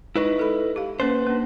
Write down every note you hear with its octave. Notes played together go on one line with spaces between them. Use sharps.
G#3 D#4 E4 B4 D#5 C#6
A4 B5
G4 F5
A#3 C#4 B4 C5
A#3 D4